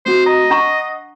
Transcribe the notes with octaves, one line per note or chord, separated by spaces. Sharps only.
A3 C4 F#4 C5
D#5 A#5
D4 F#5 A#5 C#6